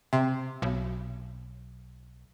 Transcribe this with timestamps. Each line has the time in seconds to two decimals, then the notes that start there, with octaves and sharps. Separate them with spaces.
0.13 C3
0.62 B1